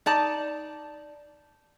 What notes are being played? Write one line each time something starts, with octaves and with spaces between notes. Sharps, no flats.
D#4 D5 A5